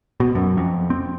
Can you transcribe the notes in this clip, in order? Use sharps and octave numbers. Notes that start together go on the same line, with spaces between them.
B2
F#2
F2
C4